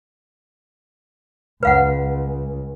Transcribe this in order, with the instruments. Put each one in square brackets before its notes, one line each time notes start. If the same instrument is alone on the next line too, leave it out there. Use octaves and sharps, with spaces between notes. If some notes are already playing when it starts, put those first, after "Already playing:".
[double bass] C#2 [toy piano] B4 F5 F#5